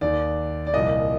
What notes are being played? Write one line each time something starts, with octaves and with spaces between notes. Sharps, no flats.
D#2 D#3 D5
D5
C2 A#2 F3 D#5